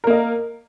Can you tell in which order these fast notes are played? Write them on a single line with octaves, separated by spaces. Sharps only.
A#4 A#3 D#5